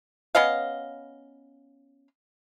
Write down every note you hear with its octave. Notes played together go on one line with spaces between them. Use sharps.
B3 C#4 D#5 F5